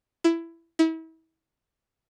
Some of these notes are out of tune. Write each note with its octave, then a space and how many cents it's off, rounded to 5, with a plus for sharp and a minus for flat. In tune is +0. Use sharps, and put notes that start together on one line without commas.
E4 +15
E4 -35